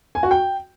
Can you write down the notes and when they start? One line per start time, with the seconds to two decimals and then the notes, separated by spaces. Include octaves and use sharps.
0.15 G#5
0.23 F#4
0.31 G5